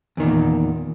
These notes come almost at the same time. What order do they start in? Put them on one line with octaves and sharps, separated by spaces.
E2 D#3 A#2